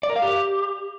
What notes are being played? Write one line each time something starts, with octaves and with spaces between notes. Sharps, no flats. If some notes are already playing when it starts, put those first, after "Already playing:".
D5
A#4
F5
G4